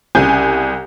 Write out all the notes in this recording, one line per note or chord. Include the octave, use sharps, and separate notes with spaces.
C2 C#3 G#5 G6